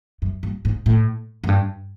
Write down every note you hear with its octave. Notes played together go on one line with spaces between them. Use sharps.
F#2
G2
G#2
A2
F#2
G2